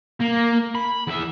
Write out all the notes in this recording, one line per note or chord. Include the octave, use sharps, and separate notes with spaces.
A#3
B5
E2 E5